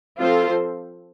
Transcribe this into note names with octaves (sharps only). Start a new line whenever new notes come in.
F3 C4 F4 A4 C5